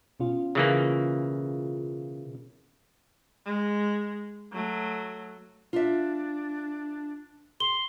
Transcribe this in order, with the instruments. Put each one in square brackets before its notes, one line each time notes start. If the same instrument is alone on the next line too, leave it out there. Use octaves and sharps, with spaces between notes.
[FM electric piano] B2 C#4 F4
[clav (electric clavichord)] C#3 E3 A#3
[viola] G#3
F#3 A3
[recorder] D4 [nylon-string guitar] F4 E5
[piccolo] C6 [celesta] G7